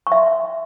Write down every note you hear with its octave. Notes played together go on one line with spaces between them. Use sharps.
C#6
E5
C6